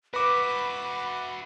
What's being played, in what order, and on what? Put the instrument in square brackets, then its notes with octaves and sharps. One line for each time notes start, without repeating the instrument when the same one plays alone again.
[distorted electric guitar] F#4 E5 [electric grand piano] B4 D6 [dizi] B5